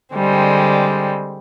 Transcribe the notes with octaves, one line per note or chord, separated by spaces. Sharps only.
D3 G3 G#3 C4